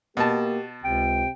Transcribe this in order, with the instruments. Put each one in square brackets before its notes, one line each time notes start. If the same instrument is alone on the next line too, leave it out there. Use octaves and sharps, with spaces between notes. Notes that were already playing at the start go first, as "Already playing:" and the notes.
[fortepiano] B2 A5 [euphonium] A#3 [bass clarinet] G4
[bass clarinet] C#2 [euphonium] C3 [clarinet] G5